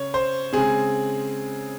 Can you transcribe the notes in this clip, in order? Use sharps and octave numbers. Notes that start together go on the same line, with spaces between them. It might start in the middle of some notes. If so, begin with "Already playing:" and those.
Already playing: C#3 C#5
C5
C#3 G#3 C4 G#4